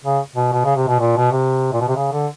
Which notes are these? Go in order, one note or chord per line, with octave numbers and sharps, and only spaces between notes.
C#3
B2
B2
C#3
C3
B2
A#2
B2
C3
A#2
B2
C3
C#3
D3